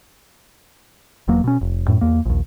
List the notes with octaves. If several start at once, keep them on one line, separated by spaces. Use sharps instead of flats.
E1 E2 F#3 A#3
B2 C#4
F1
F#2 A2
E2 A#3
A#1 D#2